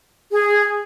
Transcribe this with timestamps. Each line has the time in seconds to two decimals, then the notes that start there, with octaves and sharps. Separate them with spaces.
0.31 G#4